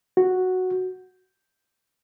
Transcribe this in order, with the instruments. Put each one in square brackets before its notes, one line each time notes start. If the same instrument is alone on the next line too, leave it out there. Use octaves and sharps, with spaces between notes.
[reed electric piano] F#4